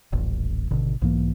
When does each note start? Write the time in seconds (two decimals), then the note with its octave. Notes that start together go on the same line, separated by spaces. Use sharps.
0.13 D#1 A1
0.71 G#1 B2 D3
1.02 B1 G#2 E3 A#3